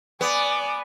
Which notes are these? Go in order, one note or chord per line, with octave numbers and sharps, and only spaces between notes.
B3 D5 G#5